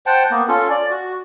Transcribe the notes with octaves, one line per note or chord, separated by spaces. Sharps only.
C5 F#5 G5 A5
A#3 B3
C#4 F4 A4
D5
F#4